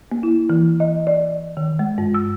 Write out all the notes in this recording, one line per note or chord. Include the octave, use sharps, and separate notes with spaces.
A#3
E4
E3
D#5
D5
D#3
G#3
G2
E6